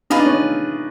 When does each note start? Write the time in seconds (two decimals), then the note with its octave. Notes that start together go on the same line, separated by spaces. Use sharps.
0.10 D#4 F4 G#4 B4
0.19 D4
0.26 C#4 D#4